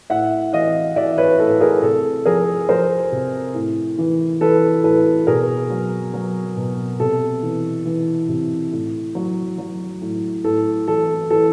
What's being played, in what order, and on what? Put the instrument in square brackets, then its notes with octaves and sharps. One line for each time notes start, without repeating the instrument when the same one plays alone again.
[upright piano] A2 E5 F#5
E3 D#5 F5
E3 D5 E5
B4 C#5
A2 A4 B4
G#4 A#4
C3 A4
F3 G#4 A#4
F3 A#4 C5
C3
A2
E3
E3 A4 B4
A2 A4 B4
B2 G#4 A#4
F#3
F#3
B2
C3 A4
E3
E3
C3
A2
F#3
F#3
A2
A2 A4
E3 A4
E3 A4